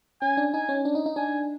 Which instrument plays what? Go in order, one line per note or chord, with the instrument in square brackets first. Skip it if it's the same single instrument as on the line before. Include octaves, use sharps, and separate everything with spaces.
[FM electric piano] C#4 [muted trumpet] G#5
[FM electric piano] D4
[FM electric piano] D#4 [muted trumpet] G#5
[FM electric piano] C#4
D4
D#4
D#4
[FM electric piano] D4 [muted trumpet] G#5